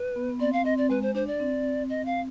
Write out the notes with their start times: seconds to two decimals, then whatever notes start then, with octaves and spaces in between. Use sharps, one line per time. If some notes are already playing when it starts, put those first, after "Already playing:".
Already playing: B4
0.16 B3
0.29 B3
0.40 C4 D5
0.53 F5
0.65 C4 D#5
0.77 D5
0.90 G#3 B4
1.02 C5
1.15 D4 C5
1.27 D5
1.40 C4
1.90 D#5
2.06 F5